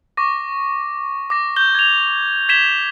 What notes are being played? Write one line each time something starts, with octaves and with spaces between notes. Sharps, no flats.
C#6 D6 A#6
D6 A#6
G6 G7
G#6 F7
G#6 B6 E7 G7